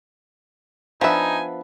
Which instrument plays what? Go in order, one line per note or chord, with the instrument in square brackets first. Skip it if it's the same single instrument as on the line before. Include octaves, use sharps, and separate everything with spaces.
[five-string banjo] F3 E5 [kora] B3 D4 B4 [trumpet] D#4 [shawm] G#5